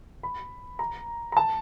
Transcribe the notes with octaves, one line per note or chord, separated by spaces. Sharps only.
B5
A#5
A#5
A5